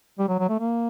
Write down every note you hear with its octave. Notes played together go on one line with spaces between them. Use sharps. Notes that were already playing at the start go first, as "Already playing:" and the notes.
G3
F#3
F#3
A3
A#3